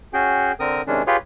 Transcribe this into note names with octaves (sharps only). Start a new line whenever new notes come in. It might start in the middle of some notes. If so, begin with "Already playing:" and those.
C#4 F#4 G#4 G5
D3 C4 A#4 D#6
C3 D#3 G#3 C#4 D4
F4 G4 G#4 B4 C#5